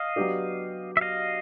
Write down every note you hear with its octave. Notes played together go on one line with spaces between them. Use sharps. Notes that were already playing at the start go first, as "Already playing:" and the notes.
Already playing: D#5 F5
F#3 B3 D4 G4
E5
D#5 F5